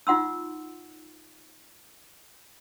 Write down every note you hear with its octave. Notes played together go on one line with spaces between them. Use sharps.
D#4 F4 F#5 C6 E6